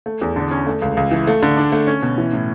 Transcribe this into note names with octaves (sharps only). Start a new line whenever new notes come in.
A3
E2
D3
C#4
A3
C#2
C#2
E3
A3
D3
D4
A3
C#4
B2
E3
A2